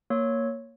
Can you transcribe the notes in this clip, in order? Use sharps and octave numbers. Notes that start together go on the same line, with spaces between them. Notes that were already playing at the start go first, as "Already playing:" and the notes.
A#3 C#5